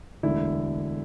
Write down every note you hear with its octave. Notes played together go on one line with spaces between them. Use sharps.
E1 D2 D3 E4